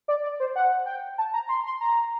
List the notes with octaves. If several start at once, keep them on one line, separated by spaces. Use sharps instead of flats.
D5
D5
C5
F#5
G5
A5
A#5
C6
C6
A#5